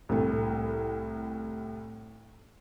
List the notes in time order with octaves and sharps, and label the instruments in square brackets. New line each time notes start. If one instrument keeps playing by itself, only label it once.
[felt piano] C2 A2